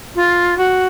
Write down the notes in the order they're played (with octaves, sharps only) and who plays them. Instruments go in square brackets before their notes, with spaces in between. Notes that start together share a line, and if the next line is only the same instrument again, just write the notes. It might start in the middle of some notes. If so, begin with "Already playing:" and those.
[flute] F4
F#4